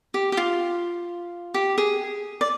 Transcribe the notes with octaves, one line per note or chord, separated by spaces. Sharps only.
G4
G4
F4
G4
G#4
D5